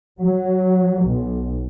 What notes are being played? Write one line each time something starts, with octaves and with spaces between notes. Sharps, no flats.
F#3
B1